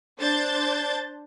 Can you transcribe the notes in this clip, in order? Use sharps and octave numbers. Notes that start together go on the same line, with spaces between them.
D4 C5 A5 G6 A6